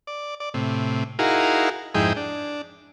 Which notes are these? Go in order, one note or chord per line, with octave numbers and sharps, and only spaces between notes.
D5
D5
A2 C3
D#4 E4 F#4 G#4 A#4 F5
F2 G#2 D#4 E4 G#4 G5
D4